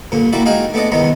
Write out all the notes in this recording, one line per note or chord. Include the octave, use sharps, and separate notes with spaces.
G2 A#2 D3
G3 A#3 E4 F#4 D5
G#3 D#4 F#4 G#4 F5 G5
A3 B3 D4 D5 D#5
E2 G2 C3 D#3 B3 D#4